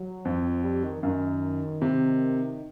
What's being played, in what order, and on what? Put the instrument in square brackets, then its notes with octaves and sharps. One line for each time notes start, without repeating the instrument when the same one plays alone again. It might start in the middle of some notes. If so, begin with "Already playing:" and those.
Already playing: [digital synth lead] F#3
[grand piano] F2 [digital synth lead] F3
[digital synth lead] F3
G3
D#3
[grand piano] F#2 [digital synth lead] D#3
[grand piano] C3